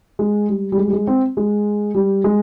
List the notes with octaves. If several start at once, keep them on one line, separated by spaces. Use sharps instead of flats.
G#3
G3
G3
G#3
G3
G#3
C4
G#3
G3
G#3